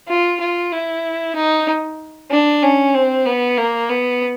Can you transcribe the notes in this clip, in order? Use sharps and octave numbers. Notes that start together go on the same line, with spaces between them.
F4
F4
E4
D#4
D4
C#4
C4
B3
A#3
B3